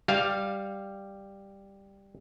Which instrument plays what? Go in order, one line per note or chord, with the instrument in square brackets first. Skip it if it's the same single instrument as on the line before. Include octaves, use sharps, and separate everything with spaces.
[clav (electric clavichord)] G3 F5